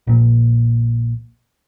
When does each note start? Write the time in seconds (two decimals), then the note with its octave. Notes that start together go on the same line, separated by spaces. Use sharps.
0.07 A#1 A#2